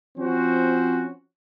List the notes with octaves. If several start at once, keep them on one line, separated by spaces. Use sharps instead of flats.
F3 C4 C#4 F#4 C5